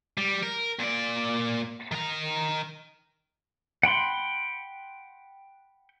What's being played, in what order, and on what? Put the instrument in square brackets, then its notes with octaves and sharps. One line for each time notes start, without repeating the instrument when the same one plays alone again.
[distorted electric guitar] G3
A#4
A#2 D5
D#3 A#5
[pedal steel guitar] F#5 G5 B5 C6